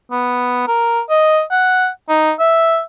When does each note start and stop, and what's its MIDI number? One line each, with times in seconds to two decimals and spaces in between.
0.11 0.67 59
0.68 1.01 70
1.10 1.42 75
1.51 1.89 78
2.09 2.32 63
2.40 2.82 76